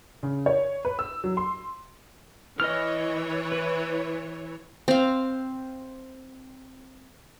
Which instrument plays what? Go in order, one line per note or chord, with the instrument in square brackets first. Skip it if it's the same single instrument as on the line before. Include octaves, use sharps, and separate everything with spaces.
[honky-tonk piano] C#3
C#5
B4
E6
F#3
C6
[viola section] E3 C#5 [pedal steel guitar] D#5 F6
[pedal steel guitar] B4
[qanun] C4 F5